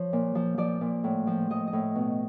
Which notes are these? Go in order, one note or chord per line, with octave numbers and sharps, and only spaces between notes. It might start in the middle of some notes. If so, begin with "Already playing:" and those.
Already playing: F3 C#5
A#2
F3
F3 D5
A#2
A2
F3
F3 D#5
D#5
A2
B2